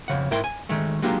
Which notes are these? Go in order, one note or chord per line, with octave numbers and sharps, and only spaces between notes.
F2 C#3 F#5
G#2 E4 A#4 G5 C6
G#5
D#3 G#3 A3
F#3 G#3 A#3 D4 F4 G4